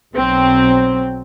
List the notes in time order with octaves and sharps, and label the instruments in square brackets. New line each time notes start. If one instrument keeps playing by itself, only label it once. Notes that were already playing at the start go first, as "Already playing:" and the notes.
[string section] B1 F#3 C4